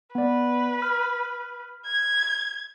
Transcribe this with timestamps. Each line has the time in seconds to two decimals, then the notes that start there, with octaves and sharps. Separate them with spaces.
0.15 B3 B4 D5
0.82 F6
1.86 G#6